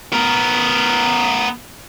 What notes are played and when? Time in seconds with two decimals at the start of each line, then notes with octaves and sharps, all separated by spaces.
0.13 B3 A#4